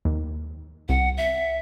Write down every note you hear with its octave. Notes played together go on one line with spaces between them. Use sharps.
D#2
C2 F#5
E5